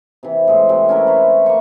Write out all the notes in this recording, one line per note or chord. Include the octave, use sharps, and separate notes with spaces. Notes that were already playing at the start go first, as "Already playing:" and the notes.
C3 E3
A2 G#3
C3
C#4 E4 A#4
B4 C#5 C6
A#3 C5 C#6